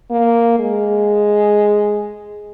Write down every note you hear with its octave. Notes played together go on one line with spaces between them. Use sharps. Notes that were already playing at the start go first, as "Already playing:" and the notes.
A#3
G#3